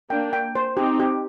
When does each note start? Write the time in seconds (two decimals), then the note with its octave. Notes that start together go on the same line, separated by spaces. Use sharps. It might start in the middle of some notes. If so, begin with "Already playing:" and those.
0.10 A#3 D4 G5
0.33 G5
0.55 C5
0.77 C4 D#4 G4
1.00 G4